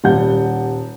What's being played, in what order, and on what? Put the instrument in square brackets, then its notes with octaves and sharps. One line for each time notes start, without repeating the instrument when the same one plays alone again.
[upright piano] D#1 G3 F#5 G6